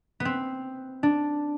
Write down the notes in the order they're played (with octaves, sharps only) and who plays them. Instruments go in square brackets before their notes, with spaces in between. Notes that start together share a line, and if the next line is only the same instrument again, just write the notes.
[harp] B3
C4
D4